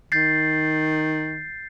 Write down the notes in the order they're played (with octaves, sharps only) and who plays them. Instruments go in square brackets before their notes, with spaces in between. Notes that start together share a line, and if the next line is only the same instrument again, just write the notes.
[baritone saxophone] D#3 [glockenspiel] G6 A6 C7